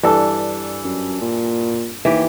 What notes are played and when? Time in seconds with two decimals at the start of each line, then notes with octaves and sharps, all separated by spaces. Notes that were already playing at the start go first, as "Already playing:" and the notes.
0.03 G2 E3 D4 A4
0.85 F#2
1.22 A#2
2.05 D#2 E3 G4